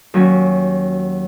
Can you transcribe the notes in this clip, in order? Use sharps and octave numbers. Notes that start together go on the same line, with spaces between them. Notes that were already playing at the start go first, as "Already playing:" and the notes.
D#2 F#3 C#4